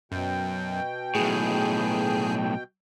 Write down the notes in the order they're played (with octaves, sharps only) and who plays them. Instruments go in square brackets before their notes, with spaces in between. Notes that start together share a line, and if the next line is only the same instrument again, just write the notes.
[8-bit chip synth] F#2 [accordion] B2 G5
[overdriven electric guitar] B1 A2 [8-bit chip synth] G#4